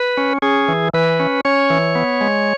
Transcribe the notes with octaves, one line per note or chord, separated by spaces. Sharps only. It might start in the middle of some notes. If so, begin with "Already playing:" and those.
Already playing: B4
C#4
C#4 G#4
E3
E3 B4
C#4
C#4 C#5
E3
B3
G#3